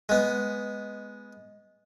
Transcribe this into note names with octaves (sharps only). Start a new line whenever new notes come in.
G#3 B3